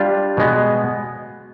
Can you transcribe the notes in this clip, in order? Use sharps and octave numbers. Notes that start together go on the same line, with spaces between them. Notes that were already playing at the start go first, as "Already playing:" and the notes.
Already playing: G3 D4 F4
B2 G#3 B3